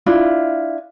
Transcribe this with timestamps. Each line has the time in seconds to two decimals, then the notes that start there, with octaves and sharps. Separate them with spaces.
0.06 D4 E4 F4